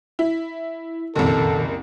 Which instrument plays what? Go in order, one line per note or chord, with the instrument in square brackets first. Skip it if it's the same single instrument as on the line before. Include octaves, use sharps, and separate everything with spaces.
[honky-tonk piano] E4
[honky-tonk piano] F#1 C2 [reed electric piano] F2 A#2 D#3 [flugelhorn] A4